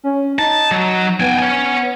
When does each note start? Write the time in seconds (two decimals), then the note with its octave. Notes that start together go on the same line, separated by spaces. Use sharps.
0.04 C#4
0.39 D#4 A5
0.71 F#3
1.20 B3 G5 G#5
1.39 C#5 G#5